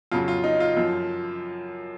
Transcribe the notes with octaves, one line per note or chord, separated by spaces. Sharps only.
F2 C#3 F#3 F4
F4
D#4
F4
F#2 F3